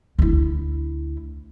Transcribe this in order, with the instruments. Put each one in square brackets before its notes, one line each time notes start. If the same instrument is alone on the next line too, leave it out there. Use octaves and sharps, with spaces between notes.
[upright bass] D2 E4